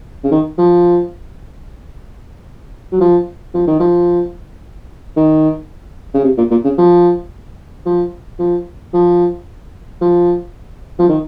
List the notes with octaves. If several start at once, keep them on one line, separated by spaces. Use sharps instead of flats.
C#3
D#3
F3
F#3
F3
F3
D#3
F3
D#3
C#3
C3
A#2
A#2
C#3
F3
F3
F3
F3
F3
F3
D#3